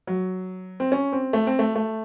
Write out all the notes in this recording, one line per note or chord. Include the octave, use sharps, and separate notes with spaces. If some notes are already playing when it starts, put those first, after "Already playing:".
F#3
C4
C#4
C4
A3
C4
A3
A3